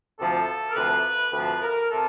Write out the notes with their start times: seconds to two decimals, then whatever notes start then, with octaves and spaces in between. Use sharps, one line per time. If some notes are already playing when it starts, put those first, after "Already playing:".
0.18 D2 C3 F3 A4
0.68 A#4
0.75 D2 C3 F3 B4
1.33 D2 C3 F3 B4
1.61 A#4
1.90 C3 A4